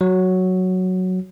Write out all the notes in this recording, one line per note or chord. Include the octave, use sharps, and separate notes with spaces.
F#3